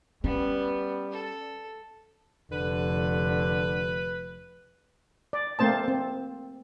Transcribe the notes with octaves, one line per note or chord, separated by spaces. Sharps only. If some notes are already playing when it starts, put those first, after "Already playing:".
G3 B3 C#4
A4
F1 D3 B4
D5
A3 A#3 C4 C5 A5
C4